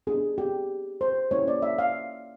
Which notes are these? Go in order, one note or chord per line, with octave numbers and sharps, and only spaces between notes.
B3 D4 G4 G#4
G4
C5
A#3 C#4 E4 G4 C#5
D5
E5
F5